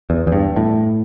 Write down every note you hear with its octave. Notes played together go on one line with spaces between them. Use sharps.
E2
E2
G2
A2